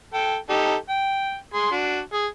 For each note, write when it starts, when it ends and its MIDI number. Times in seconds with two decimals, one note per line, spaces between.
0.14 0.36 69
0.14 0.36 79
0.50 0.74 63
0.50 0.74 67
0.50 0.74 69
0.89 1.36 79
1.54 1.71 68
1.54 1.71 84
1.71 1.99 62
1.71 1.99 66
2.13 2.26 68